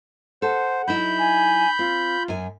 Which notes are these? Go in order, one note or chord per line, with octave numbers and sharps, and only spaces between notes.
A4 C5 F#5
F#3 D#4 E4 B5 G6
G#5
C4 F4
F#2 G#5